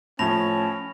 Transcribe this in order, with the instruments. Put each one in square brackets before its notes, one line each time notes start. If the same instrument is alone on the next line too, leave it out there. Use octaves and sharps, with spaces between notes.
[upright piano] A2 F3 [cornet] C#4 [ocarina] A5 [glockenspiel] B5 A#6 F7